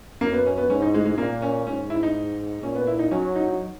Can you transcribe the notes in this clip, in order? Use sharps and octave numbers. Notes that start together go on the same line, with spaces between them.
F#2 A#3
B3
C#4
B3
G#2 C#4
D#4
G#3
G#3
A#2 A#3
C#4
G#2 C#4
E4
D#4
A#2 C#4
B3
E4
D#4
F#3 C#4
D#4
D#4